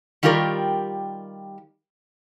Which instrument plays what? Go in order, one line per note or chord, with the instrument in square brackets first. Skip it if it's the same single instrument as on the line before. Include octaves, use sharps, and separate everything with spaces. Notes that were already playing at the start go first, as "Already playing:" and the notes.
[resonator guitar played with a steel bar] D#3 G3 F4 G4 A#4 D5